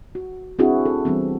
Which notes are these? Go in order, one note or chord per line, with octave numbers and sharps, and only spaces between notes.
F#4
C4 D4 E4 F#4 G#4
A4
E3 G3 B3 C4